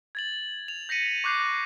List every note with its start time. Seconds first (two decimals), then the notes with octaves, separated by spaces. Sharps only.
0.15 G#6 A6 F#7
0.68 F7
0.89 G6 A#6 B6 C#7 D#7
1.24 C#6 D6 F#6 G6 C7 F7